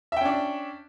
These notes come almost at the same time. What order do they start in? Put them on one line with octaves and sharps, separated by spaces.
E5 G5 C#4 D4